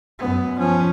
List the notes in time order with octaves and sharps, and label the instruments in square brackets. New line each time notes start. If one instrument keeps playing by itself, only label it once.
[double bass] F#2 B3
F3 C#4